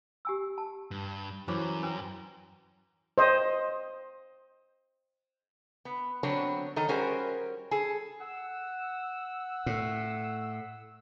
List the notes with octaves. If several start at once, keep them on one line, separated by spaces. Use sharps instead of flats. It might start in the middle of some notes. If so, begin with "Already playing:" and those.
G4 G#5 E6
A5
G2
F#2 E3 F#3 C5 D6
C#4 B4 G#5
C5 D#5
B3
D3 F#3 B3 C4 D4 C#5
D#3 A4 D#5 A#5
G3 C#4 F#4 G#4 A#4 C5
G#4 A4
F#5 E6
A2